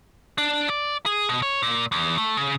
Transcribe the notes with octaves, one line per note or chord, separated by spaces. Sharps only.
D4
D5
G#4
B2
C#5
A#2
E2
A3
C#3